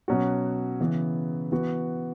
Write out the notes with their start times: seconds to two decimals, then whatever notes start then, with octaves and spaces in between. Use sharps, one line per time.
0.08 B2 F#3 C#4 F#4
0.80 C#3 E3 B3
1.52 E3 B3 F#4